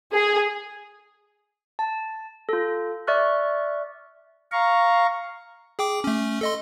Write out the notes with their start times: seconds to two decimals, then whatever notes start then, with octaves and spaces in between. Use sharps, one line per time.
0.14 G#4
1.79 A5
2.49 F4 A4
3.07 D5 E5 C#6 F6 F#6
4.52 F5 A#5 C#6
5.79 G#4 G5 D6
6.04 A3 C#4
6.41 A4 D#5 C6